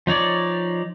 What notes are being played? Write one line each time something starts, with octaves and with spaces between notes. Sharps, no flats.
F3 D#4 C#5 D5